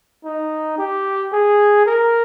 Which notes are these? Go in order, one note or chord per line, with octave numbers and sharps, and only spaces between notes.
D#4
G4
G#4
A#4